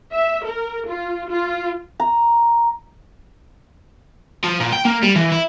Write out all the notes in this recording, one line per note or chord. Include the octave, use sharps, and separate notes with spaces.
E5
A#4
F4
F4
A#5
F3
A#2
G5
A#3
G3
E3
E4